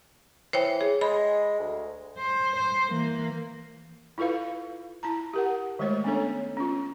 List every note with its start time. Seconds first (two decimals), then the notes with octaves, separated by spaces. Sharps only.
0.53 E3 C5 C#5 G5
0.81 G#4
1.01 G#3 B5
1.60 D2
2.18 C5
2.56 C5
2.89 E3 A#3
4.18 E4 F4 A4 B4 F5
5.03 E4 A5 A#5
5.33 G4 A#4 F#5
5.79 D#3 G#3 A3 C5 C#5
6.04 B3 C#4 D4 A4 C#5
6.57 C#4 F4